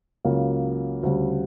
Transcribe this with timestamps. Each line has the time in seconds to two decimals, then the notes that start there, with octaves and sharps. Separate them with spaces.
0.25 C#2 C#3 F#3 A#3
1.03 D2 C#3 G3